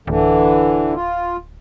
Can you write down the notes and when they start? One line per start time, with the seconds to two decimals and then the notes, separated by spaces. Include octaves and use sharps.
0.07 D1 D3 E3
0.94 F4